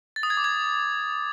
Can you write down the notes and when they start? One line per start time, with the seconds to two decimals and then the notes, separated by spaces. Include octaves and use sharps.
0.16 A6
0.23 D#6
0.30 G#6
0.37 D6
0.44 G#6